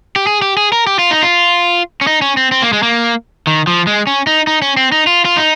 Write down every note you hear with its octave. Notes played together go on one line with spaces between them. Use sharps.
G4
G#4
G4
G#4
A#4
G4
F4
D#4
F4
C#4
D#4
C#4
C4
C4
A#3
G#3
A#3
D#3
F3
G#3
C#4
D#4
D#4
C#4
C4
D#4
F4
F4
D#4